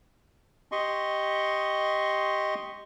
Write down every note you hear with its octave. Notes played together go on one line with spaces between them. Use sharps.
G4 D#5 C6 C#6